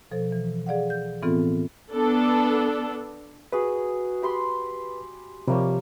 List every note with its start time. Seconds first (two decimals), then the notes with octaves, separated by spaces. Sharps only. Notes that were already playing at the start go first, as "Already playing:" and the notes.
0.11 B2 F3 A4 C5
0.32 E3
0.66 G#4 D5 F5 F#5
0.90 G6
1.22 A2 E3 B3 C4 F4 A4
1.93 B3 D4 A4
3.53 F#4 G#4 B4
4.22 G4 B5 C6
5.47 C3 F3 G3 A#3 C#5